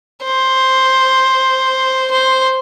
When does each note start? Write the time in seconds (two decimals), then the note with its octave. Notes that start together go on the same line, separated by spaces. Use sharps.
0.25 C5
2.11 C5